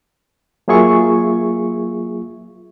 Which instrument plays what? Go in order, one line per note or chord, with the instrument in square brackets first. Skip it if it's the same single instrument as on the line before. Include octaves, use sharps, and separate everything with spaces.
[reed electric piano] F#3 A#3 F4 G#4 E5 C#6